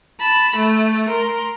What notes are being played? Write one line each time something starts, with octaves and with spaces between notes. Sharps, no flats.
A5 B5
A3
A#4 C6